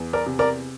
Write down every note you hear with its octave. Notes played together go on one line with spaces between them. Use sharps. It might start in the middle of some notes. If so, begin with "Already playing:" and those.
Already playing: E2
A#4 D5
C3
A#4 D5